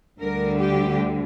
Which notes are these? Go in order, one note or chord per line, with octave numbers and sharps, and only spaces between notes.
D2 D3 G3 A#4
G4